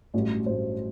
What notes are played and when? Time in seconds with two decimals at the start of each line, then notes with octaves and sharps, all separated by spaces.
0.14 A1 G2 F#3 A3
0.46 A1 G2 F#3 A3 C5